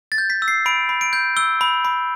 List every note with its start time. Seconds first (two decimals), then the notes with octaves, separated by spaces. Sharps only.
0.12 A6
0.18 G6
0.30 B6
0.42 E6
0.48 C7
0.66 B5 D7
0.89 B5
1.01 D7
1.13 G6
1.37 E6 G7
1.61 B5
1.85 B5